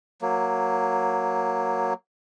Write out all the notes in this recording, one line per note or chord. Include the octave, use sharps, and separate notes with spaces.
F#3 A#3